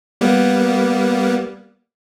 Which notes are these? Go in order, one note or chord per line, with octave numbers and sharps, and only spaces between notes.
G3 A#3 B3